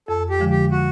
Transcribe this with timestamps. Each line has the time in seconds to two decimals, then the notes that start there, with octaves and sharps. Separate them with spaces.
0.08 F2 A4
0.30 G4
0.39 D3 F3 G#3
0.51 G4
0.71 F#4